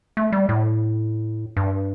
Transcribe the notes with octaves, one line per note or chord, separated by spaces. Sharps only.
A3
G3
A2
G2